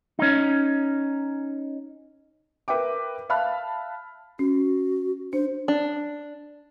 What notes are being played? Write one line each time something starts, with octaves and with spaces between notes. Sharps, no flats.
C#4 D#4
A#4 B4 E5 G5 D6
E5 F5 A5 B5 F6 F#6
C#4 F#4
D4 C5
D4